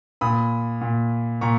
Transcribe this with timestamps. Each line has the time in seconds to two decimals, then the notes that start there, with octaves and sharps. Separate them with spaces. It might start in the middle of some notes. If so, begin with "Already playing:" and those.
0.21 A#2 B5 D#6
0.81 A#2
1.41 A#2 A#5 C#6